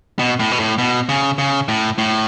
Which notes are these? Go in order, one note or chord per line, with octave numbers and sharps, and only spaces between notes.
B2
A2
B2
A2
B2
C#3
C#3
A2
A2